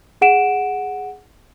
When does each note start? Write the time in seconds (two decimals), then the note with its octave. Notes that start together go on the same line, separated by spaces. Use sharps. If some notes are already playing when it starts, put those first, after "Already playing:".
0.21 G#4 F#5 D7 E7